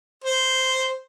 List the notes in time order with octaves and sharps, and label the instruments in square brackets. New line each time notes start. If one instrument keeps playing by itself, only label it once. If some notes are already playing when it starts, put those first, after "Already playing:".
[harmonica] C5